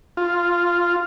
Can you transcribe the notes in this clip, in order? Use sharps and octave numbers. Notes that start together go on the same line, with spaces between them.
F4